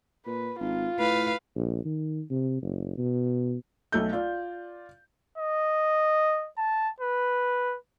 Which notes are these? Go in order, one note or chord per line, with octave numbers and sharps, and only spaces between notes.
A#2 B4
G#1 F4
A2 B4 F5
A#1
D#3
C3
F#1
B2
B1 A3 G6
F4 D5
D#5
A5
B4